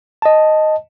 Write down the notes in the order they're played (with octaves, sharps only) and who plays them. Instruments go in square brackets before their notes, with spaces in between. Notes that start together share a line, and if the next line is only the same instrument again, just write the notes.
[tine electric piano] D#5 A5